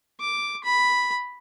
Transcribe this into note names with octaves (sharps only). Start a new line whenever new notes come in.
D6
B5